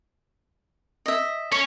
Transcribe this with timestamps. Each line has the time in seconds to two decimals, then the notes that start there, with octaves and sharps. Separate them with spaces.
1.06 D#5 E5
1.52 C#4 C#6